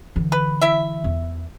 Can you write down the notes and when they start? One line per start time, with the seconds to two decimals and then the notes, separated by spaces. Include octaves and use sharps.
0.16 D3 E3
0.32 B4
0.61 E4 E5
1.04 E2